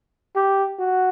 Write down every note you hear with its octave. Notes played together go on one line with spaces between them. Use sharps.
G4
F#4